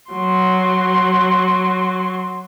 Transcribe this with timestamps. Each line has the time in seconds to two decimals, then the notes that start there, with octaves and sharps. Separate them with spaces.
0.11 F#3 C6